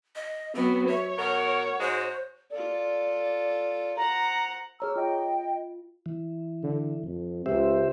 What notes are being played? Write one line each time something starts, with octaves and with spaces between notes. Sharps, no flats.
D#5
F#3 B3 C4
C#5 E5
B2 A#4 F#5
G#2 G#3 F#4 C5
F4 A4 D5
C5 F#5 A#5
G#4 C#5 A#5 E6 F6
F4 D#5 G5
E3
D3
F2
C#2 G4 C5 E5